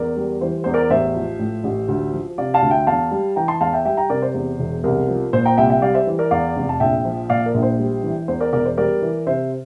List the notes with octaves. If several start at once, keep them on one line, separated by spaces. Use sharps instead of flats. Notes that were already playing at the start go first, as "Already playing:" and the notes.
Already playing: E2 A#4 D5
G3
E3 C5
E2 C5
A#4 D5
A1 C5 E5
F3
A2
A1
D2
F3
C3 D5 F5
F5 A5
D2
E5 G5
E2 F5 A5
G3
E3 G5 A#5
A5 C6
E2 F5 A5
E5 G5
G3 E5 G5
G5 A#5
C3 A#4 D5
C5
E2
E1
C2 A#4
F3
A#2 C5
G5 A#5
C2 E5 G5
E5 G5
G3 D5 F5
C5 E5
E3
A#4 D5
E2 D5 F5
F1
A5
A#1 E5 G5
F3
A#2 D5 F5
A#4
A#1
C5
G3
E3
E2 C5
A#4 D5
E1 A#4 D5
C5
G3 A#4 D5
E3
C3 C5 E5